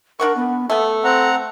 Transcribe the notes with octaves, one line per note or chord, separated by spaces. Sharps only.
D4 A#4 F#5 C#6
B3
A3 B3 A4
C4 F#5 A#5